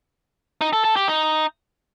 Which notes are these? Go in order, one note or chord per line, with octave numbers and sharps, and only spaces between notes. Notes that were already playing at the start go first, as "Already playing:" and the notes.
D#4
A4
A4
G4
D#4